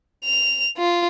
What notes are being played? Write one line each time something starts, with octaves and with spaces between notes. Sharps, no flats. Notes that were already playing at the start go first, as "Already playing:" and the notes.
F7
F4